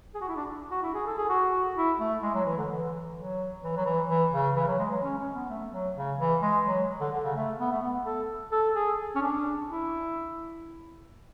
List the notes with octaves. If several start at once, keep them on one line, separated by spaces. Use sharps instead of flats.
G#4
F#4
E4
D4
F#4
E4
G#4
A4
G#4
F#4
E4
A3
G#3
F#3
E3
D3
E3
F#3
E3
F#3
E3
E3
C#3
E3
F#3
G#3
F#3
C#4
C#4
B3
A3
F#3
C#3
E3
G#3
F#3
D3
D3
C#3
A3
B3
A3
B3
A4
A4
G#4
C#4
D4
E4